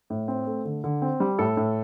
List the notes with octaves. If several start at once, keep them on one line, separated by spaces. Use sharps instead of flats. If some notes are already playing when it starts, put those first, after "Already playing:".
A2
C4
A3
D3
D3
C4
G3
A2 A4
A2